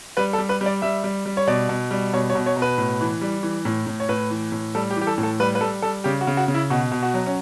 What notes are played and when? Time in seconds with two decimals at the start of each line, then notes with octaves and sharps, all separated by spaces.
0.17 G3 B4
0.33 A4
0.38 G3
0.49 B4
0.61 G3
0.66 D5
0.82 G3 E5
1.04 G3
1.26 G3
1.37 C#5
1.47 B2 D5
1.69 B2
1.91 G3
2.13 B2 C#5
2.30 C#5
2.35 B2
2.46 C#5
2.57 B2
2.62 B4
2.78 A2
3.01 E3
3.21 G3
3.43 E3
3.65 A2
3.87 A2
4.00 C#5
4.09 A2 B4
4.30 E3
4.52 A2
4.75 G3 A4
4.90 G4
4.96 E3
5.01 G4
5.07 A4
5.18 A2
5.23 A4
5.40 G3 B4
5.55 B4
5.61 G3 A4
5.82 G3 A4
6.04 C#3 G4
6.21 F#4
6.27 C#3
6.37 F#4
6.48 C#3
6.54 E4
6.70 B2 F#4
6.92 B2
7.03 F#4
7.14 F#3
7.26 C#4